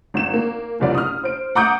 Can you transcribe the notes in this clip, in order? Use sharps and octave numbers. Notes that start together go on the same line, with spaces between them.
G#1 E7
A#3
F#1 C2 F3 D5
D#6 F6
C5 D7
F#5 A#5 D6 D#6 G6 D7